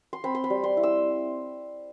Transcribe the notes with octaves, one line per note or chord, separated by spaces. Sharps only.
C6
C4 B5
C6
B5
G3
C6
E4
E6